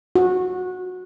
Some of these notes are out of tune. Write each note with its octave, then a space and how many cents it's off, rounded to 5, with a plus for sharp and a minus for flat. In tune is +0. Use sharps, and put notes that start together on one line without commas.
F#4 -15